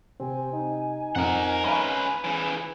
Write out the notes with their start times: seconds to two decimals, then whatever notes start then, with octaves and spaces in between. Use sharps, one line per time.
0.20 C3 C4 G#5
0.53 D#4
1.15 F2 A#4 F#5 A#5 F6
1.64 C#4 B4 F5 A#5 B5
2.24 C#3 E3